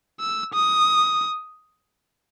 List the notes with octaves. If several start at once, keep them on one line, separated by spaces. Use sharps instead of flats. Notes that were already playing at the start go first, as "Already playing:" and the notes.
E6
D#6